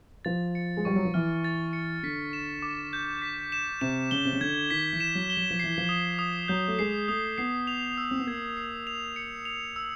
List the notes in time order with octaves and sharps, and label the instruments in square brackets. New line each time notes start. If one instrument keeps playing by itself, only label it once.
[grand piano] F3 [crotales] A6
[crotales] C#7
[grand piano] G#3
[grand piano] G3 [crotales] C#6
[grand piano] F#3
F3
[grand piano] E3 [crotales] F6
[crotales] A6
C#7
[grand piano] D3 [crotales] B6
[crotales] E7
D6
G6
B6
E7
[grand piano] C3 [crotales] E7
[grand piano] C#3 [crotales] G7
[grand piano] C3
C#3
[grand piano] D3 [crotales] G#6
[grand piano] D#3 [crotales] B6
[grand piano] E3
[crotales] E7
[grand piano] F#3
[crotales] G7
[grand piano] F#3
F3
[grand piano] E3 [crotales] C7
[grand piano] F3
[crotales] D#6
D#6
[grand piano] F#3 [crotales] G6
[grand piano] A3
[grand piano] G#3 [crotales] C7
[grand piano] A3 [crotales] D#6
[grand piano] B3 [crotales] C7
[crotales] F7
E6
[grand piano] C4
B3
[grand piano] A#3 [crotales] G#6
[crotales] C7
F7
C#7
F7
E6